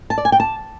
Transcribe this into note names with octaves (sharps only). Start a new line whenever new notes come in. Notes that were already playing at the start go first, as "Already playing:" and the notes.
A5
D5
G#5
G5
A5